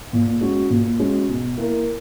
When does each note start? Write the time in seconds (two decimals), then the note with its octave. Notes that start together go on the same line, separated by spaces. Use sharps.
0.13 A#2
0.41 G#3 C#4 F#4
0.70 A#2
1.00 G#3 C#4 F#4
1.29 B2
1.57 A#3 E4 A#4